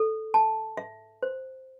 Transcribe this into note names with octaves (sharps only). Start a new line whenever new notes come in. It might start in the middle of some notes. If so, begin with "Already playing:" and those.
Already playing: A4
A5
E5
C5